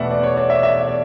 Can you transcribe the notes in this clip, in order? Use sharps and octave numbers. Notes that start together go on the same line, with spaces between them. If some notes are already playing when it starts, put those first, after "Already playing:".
Already playing: E2 B2 A3 B4 D5 E5 F#5
D5
C#5
D5
E5
E5
D5